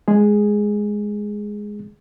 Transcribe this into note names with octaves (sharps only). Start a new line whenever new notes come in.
G#3 G#4